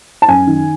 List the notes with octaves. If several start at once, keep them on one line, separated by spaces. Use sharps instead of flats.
A5
F#2 G#5
D#3